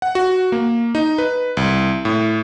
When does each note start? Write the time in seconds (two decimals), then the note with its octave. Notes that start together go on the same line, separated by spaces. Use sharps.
0.02 F#5
0.15 F#4
0.52 A#3
0.95 D#4
1.18 B4
1.57 C2
2.05 A2